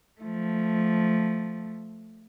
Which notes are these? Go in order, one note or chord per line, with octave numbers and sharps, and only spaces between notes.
F3 A3